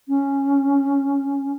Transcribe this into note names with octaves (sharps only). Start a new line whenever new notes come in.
C#4